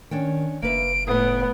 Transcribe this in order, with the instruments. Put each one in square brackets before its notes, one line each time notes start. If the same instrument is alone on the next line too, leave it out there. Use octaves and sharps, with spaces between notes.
[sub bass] D#3 [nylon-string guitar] C#4 D4 G5
[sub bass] F#1 [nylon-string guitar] A#3 B4 E5 [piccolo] D7
[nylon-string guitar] D#2 A2 [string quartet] A3 B3 [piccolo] D#6